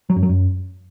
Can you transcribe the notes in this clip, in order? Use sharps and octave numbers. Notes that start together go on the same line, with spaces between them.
F#3
F#2
F#3
F#2